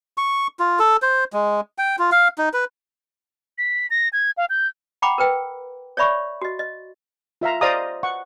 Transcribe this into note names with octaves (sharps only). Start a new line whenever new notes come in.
C#6
F4
A4
C5
G#3
G5
F4
F5
D#4
B4
B6
A#6
G#6
F5
G6
F#5 G5 A#5 B5 D6
A#4 B4 G5
C#5 D5 E5 B5 C#6
F#4 D#5
D#5
F4 E5 F5 A#5
C5 D5 D#5 F5 A#5 D#6
F#5 C#6